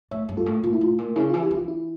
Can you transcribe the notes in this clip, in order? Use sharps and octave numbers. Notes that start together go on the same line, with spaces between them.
A2 C#5 E5
G2
F4 A4
A2
A#2 F4
E4
A2 F4
A#2
C#3 E4
F4
E3
E4 G4
E3 F4
E4